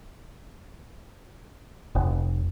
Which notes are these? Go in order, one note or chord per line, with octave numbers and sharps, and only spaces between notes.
F1